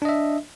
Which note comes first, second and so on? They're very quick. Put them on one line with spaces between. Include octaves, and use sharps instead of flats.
D4 D#5 E5